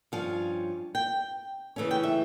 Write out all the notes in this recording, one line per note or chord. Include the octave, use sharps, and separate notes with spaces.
G2 F3 C#4 F5
G5
C#3 E3 A3 C#4
G5
E5